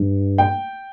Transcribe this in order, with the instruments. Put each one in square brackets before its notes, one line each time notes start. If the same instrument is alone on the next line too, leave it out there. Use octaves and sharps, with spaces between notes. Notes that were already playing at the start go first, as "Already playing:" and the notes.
Already playing: [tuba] G2
[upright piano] G5